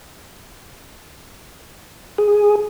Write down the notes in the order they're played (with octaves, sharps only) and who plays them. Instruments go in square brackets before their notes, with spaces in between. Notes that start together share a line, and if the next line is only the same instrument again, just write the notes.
[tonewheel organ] G#4